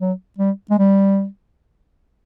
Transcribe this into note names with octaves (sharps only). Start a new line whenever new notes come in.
F#3
G3
G#3
G3